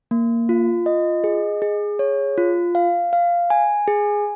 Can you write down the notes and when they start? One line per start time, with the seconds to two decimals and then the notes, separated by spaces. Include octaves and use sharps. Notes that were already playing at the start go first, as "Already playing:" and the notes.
0.11 A#3
0.49 F4
0.86 D#5
1.24 G#4
1.62 G#4
1.99 C#5
2.38 F4
2.75 F5
3.13 F5
3.50 G#5
3.88 G#4